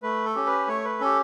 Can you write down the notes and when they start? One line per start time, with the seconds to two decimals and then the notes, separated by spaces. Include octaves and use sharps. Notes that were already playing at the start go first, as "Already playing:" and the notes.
0.03 A3 B4
0.25 A4
0.35 C#4 G4
0.46 B4
0.67 A3 C#5
0.84 B4
1.00 C#4 G4 A4